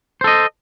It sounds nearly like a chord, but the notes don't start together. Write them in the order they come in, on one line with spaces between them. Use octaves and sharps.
C5 A4 D#5